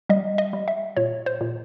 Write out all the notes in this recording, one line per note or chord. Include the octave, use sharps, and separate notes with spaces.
G3 D#5
D#5
G3
E5
A#2 C#5
C5
A#2